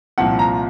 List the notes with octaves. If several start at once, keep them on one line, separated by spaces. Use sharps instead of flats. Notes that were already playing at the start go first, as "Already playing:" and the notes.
C2 A#2 F3 C4 F#5
A#5